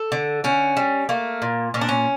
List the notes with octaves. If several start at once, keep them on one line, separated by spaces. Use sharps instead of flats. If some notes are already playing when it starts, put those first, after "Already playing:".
Already playing: A4
D3
D3 C#4
G3
A3 A#3
A#2
A#2 C#4
D4
C#4